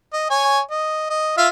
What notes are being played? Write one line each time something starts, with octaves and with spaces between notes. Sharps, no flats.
D#5
C#5 G#5
D#5
D#5
F4 E5 F5